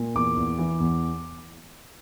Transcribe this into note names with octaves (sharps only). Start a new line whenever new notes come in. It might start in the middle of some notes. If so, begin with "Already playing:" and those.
Already playing: A#2
E2 D6
E2
E3
E2